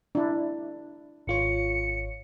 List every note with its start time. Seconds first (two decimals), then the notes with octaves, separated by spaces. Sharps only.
0.15 D4 E4
1.27 G#1 F4 C#5 C#7